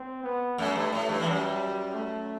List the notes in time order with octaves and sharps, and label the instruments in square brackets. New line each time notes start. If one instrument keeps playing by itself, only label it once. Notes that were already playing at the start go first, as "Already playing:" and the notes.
Already playing: [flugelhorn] C4
B3
[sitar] F#2 [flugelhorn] A3
[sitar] G2
A2
G2
E3
[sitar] F#2 [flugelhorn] G3
[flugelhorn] A3